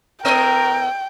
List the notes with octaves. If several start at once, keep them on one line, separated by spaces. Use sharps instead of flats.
A2 B3 A#4 D#5 G5